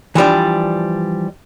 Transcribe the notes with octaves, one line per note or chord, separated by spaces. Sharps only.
E3 F3 G3 D4